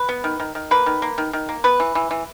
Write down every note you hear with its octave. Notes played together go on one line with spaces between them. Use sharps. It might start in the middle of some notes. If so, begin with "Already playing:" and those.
Already playing: B4
B3
D#3
D#3
D#3
A#3 B4
D#3
A#3
D#3
D#3
A#3
B3 B4
E3
E3
E3